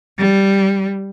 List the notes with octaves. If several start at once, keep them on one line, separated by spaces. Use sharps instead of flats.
G3